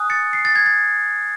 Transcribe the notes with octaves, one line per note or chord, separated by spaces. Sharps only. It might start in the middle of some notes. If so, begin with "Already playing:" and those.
Already playing: G#5 D#6 F#6
A6 C#7
C7
A6
G#6
A6